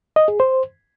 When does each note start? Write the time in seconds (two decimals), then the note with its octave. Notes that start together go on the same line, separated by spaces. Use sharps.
0.16 D#5
0.28 G#4
0.40 C5